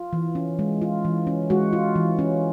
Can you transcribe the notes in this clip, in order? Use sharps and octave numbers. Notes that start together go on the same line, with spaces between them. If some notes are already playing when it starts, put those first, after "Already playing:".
Already playing: F4
E3
C#4
G#3
F4
E3
C#4
G#3 F#4
F4
E3
C#4